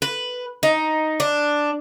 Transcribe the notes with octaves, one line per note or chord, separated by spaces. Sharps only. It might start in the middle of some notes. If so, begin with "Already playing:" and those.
B4
D#4
D4